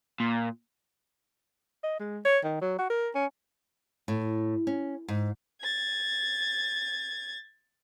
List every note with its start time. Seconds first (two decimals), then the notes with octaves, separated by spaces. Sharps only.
0.20 A#2
1.84 D#5
1.99 G#3
2.25 C#5
2.44 D#3
2.62 F#3
2.78 F#4
2.90 A#4
3.15 C#4
4.08 A2
4.67 C#4
5.08 G#2
5.61 G#6 A6